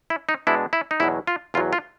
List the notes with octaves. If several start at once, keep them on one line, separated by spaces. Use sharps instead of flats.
E4
D#4
B2 G#3 B3 D4 E4
E4
D#4
E2 B2 F#3 E4
F4
E2 B2 F#3 F4
F4